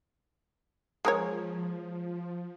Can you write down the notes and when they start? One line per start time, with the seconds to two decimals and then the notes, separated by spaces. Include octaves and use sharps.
1.05 F3 G#3 A#4 C#5